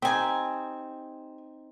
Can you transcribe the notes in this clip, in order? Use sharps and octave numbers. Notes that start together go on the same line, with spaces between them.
C4 D#4 G4 G#5